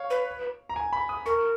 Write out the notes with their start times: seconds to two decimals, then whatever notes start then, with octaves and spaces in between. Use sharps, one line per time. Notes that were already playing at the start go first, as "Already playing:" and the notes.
Already playing: C#5 F5
0.10 B4
0.69 A#5
0.76 G#5
0.93 B5
1.09 D#6
1.26 A#4 C#6